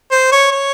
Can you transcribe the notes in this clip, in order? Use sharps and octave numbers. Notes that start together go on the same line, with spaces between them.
C5
C#5
C#5